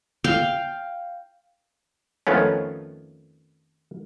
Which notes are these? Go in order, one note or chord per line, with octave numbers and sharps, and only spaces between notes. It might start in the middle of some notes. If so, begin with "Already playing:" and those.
F5 G5
F2 D#3 F3 A3 B3 C#4